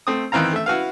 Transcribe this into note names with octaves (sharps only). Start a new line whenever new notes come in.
A3 C4 D#6
D#3 E3 C4 F5 A#5
A3 E5
E4 F#4 B4 F5